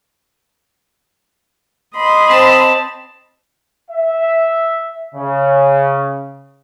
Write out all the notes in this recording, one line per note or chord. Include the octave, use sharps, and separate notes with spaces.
D#5 B5 C6
C4 A5
E5
C#3